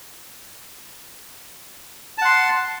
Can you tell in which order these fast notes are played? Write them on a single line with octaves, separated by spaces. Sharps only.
A5 F#5 C6